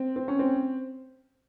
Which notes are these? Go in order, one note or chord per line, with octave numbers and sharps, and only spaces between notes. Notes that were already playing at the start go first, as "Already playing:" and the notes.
Already playing: C4
C4
C#4
C4